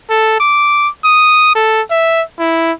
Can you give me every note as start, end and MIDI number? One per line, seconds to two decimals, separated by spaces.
0.10 0.35 69
0.40 0.88 86
1.04 1.51 87
1.55 1.81 69
1.91 2.22 76
2.39 2.72 64